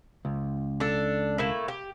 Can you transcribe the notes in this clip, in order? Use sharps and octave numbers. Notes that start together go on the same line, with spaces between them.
C#2
D4 A4
A3 A#3 E4
G4